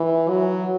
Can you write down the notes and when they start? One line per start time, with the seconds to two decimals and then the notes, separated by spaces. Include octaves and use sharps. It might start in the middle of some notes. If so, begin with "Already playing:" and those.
Already playing: E3
0.29 F#3